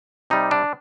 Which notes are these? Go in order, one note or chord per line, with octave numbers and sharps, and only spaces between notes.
C3 G3 D#4
D4